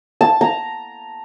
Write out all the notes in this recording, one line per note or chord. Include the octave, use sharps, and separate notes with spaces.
A5
A#5